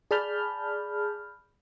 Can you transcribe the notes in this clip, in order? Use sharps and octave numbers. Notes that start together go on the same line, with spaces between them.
G#4 D5 A5 B5 F6 G6